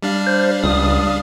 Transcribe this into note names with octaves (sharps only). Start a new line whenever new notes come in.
G3 D4 F5
C5
C#2 D#6